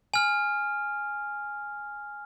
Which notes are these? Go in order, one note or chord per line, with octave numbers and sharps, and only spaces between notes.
G#5 F6